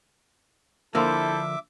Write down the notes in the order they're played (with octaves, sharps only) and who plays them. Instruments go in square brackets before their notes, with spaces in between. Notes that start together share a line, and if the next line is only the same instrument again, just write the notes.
[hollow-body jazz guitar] D3 F3 A#3 [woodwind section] E4 C5 [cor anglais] A4 [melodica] E5 D6